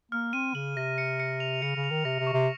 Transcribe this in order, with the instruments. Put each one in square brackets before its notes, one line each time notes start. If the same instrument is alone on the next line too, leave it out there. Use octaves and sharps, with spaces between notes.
[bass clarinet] A#3 [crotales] F6
[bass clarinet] C4 [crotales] D#7
[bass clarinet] C#3 [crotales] F#7
[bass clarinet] C3 [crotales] A#6
[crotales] C#7
C#7
F7
[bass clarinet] C#3 [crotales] C#7
[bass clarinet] C#3
[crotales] F7
[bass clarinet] D#3
[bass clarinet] C3 [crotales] A#6
[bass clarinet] C3
[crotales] C#6
[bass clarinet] C3